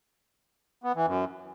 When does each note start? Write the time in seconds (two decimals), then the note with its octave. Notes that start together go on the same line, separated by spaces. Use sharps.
0.84 B3
0.95 E3
1.06 F#2